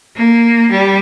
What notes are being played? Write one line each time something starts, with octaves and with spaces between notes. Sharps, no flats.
A#3
G3